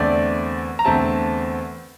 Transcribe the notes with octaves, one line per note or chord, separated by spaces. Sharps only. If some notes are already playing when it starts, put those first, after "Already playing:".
Already playing: E2 D3 A3 C4 D5
A#5
E2 D3 A3 C4 A5